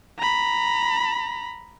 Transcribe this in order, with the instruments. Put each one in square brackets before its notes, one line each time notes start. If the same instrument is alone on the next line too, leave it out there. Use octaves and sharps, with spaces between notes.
[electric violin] A#5 B5